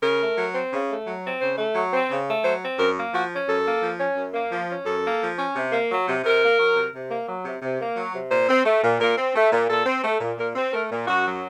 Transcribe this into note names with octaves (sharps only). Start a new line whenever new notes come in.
C#3 A#4
A3
F#3
C4
C#3
A3
F#3
C4
C#3 C5
A3
F#3
C4
C#3
A3
F#3 C5
C4
F#2 A#4
A#3
F3 F#4
C#4
F#2 A4
A#3
F3
C#4
F#2
A#3
F3
C#4
F#2 A4
A#3
F3
C#4
C3
A#3
F#3
C3
C3 A#4
A#3
F#3
C3
C3
A#3
F#3
C3
C3
A#3
F#3
C3
A#2 C5
C4
A3
A#2
A#2 A#4
C4
A3
A#2
A#2 A4
C4
A3
A#2
A#2 A#4
C4
A3 A#4
A#2
F#2 F#4
F#3